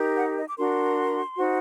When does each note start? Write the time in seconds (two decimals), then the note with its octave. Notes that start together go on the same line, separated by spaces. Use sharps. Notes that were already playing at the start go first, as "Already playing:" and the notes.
Already playing: D#4 G4 A#4
0.17 F#5
0.38 D#5
0.47 D6
0.57 D4 F#4 A#4 C6
1.37 D#4 F#4 C5